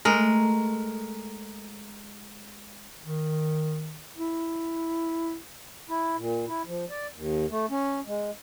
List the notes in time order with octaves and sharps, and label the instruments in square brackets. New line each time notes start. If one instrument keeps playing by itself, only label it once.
[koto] G#3 A#4 [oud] A3
[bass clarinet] D#3
E4
[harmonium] E4
A#2
E4
F3
D5
D#2
A3
C#4
G#3